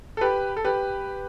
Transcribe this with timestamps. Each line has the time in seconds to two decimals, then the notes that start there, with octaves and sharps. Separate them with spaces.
0.17 A4
0.21 G4 B4
0.57 A4
0.64 G4 B4